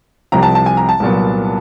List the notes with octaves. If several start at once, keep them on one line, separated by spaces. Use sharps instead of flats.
C2 C3 F3 A#5
A5
A5
G#5
A#5
A5
C2 A#2 F#3 B3